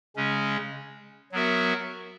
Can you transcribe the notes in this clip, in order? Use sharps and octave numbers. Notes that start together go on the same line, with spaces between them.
C#3 G#3 C#4
F#3 B3 F#4 A#4 E5